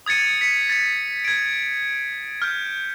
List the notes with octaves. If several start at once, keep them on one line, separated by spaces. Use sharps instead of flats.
D#6 G#6 A6 C#7 D#7
B6 C#7
A6 C#7
G#6 D7
F6 G6